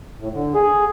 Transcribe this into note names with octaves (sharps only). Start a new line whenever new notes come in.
A2
D3
G#4